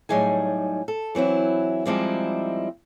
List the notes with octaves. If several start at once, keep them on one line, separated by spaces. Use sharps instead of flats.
A2 F#3 G3 D#4 G#4 G#5
A4
E3 F#3 C4 E4
F3 G3 G#3 C4 D#4 E4